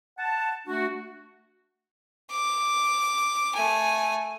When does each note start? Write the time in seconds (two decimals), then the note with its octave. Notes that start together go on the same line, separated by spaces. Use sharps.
0.18 F#5 A5
0.67 A3 D4 F#4
2.31 D6
3.55 A3 G#5